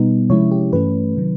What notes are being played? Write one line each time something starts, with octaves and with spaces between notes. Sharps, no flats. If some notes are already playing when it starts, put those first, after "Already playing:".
Already playing: B2 G3 B3 D#4
C3 F3 G#3 C#4 E4 C#5
G4
G2 E3 A3 C#4 B4
C3 D#3 F#3